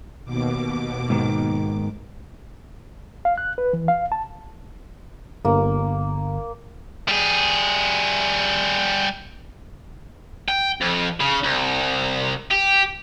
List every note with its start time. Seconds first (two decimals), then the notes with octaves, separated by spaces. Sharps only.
0.25 D#2 B2 D6
1.10 G#2 D#3
3.25 F5
3.38 F#6
3.58 B4
3.73 E3
3.88 F5
4.12 A5
5.45 G1 A#3
7.08 G3 G#4
10.48 G5
10.81 F2
11.20 C#3
11.44 C2
12.51 G4